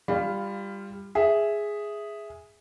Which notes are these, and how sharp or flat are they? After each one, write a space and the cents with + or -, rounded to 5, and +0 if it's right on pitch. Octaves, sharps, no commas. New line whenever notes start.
G3 +15 F4 -15 F5 +0
G#4 +0 E5 +0